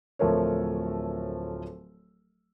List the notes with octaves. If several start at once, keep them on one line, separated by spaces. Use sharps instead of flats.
D1 F3 A3 A#4 C#5